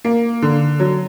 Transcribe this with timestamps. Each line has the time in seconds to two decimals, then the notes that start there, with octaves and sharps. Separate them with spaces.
0.05 A#3
0.42 D3
0.80 F#3